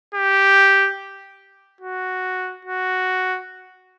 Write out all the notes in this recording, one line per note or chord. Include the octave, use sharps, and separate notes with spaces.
G4
F#4
F#4